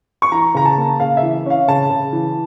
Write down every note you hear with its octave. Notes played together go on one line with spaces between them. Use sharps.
C#6
E3 A#5
C#3 A#5
A5
A#3
C#3 F5
E5
E3
C#4 F5
C#3 A5
C#3
E3